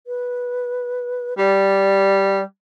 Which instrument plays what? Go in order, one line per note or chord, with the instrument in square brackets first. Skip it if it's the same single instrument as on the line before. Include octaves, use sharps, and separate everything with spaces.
[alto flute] B4
[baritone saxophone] G3 [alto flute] D5